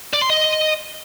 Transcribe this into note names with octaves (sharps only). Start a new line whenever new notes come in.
D5
C6
D#5